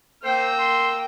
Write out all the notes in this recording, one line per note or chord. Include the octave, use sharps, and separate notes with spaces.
A#3 C5 G5 E6
C6